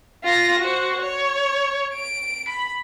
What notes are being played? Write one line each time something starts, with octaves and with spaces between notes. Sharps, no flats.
F4 A#6
F#4 C5
C#5
D7
B5